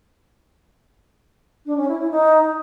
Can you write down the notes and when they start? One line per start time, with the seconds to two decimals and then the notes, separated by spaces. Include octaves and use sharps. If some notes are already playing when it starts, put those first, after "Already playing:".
1.65 D4
1.77 C#4
1.88 E4
1.99 E4
2.11 D#4